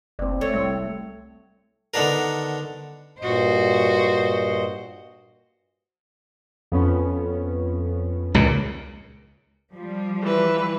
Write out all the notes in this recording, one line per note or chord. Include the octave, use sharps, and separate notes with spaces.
F#1 C4 D5
A3 C#5
C2 C4
D3 D#3 B3 D4 A#4
G2 A#2 F#4 C5 D#5
F2 B3 C#4
C#2 A#2
F3 G3
E3 B4